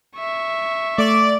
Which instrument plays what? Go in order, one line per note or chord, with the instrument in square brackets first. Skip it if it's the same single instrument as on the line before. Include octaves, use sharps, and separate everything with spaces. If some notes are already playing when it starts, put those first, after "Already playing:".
[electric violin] E5 C#6
[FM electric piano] A3 [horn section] D5